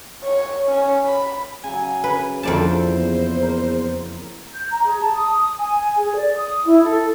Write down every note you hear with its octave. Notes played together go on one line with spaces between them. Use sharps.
C#5
C#4
B5
C#3 F#3 G#5
B4
A#1 F2 A#3 E4 A#4 C5 D5 A5
E2
A#4
G6
A#5
G#4
A5
D#6
G#5
G#4
D5
D#6
E4
A4